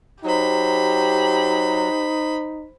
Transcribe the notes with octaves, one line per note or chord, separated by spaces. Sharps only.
F#3 D#4 G4 C5 B5